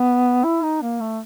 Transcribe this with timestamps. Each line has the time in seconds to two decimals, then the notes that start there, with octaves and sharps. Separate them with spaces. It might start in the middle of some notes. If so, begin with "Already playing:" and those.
Already playing: B3
0.44 E4
0.63 D#4
0.82 A#3
1.01 A3